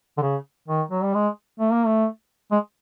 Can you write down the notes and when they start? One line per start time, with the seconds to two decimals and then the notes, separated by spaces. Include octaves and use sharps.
0.17 D3
0.22 C#3
0.68 D#3
0.91 F#3
1.03 G3
1.14 G#3
1.60 A3
1.72 A#3
1.86 A3
2.52 G#3